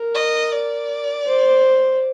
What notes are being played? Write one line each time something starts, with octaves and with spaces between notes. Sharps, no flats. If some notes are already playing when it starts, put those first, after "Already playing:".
Already playing: A#4
D#5
D5
C5